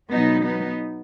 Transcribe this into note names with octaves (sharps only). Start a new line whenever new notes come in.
B2 F#3 B3 D#4
B3 D#4